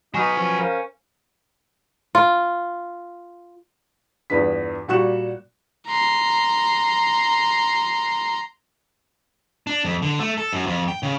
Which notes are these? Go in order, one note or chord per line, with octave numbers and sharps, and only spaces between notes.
F#3 D#4 B4 G#5 C#6 F6
F3 C#4
A#4 C5 F5
F4
E2 G2 B3 F4 B6
A#2 G3 F#4 C#6 F#6 E7
A#5 C6
D4
F2
D3
A3
A4
F#2
F2
G5
C#3